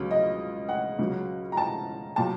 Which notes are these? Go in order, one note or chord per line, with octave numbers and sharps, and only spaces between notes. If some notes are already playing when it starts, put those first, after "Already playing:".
Already playing: C#2 C#3 F#3
D#5
F#5
C#2 C#3 F#3
A#5
A5
A#2 F#3 A5